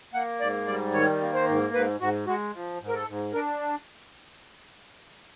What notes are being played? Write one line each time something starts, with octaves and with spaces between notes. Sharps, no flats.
A#3 F#5
G#2 D5
G3 D5
D#3 C#5
A#3
C5
G#2
G#2 B4
G#2 F#4
G#3 F#4
F3
G#2
A#4
A4
G#2
D4 A#4